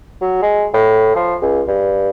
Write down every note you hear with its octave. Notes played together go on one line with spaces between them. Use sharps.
F#3
G#3
A2
F3
C#2
G2